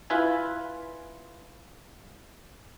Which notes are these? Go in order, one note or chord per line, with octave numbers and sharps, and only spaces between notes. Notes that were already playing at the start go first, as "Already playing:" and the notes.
E4 F4 B4 E5 G#5